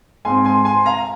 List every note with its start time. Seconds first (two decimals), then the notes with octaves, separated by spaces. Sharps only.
0.25 G#2 G#3 C4 G#5 C6
0.45 G#5 C6
0.65 G#5 C6
0.86 F5 A#5